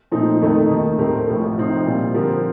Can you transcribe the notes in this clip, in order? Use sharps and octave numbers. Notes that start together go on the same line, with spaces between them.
A#2 F3 A3 C4 D#4
F2 D#3 A3 D#4 A4
D#2 D#3 A3
A2 A3 C4 G4 A#4
A1 A2 F3 A3
C3 F3 C4 D#4
A#2 G3 C4 F4
D3 F3 C4 G4 A#4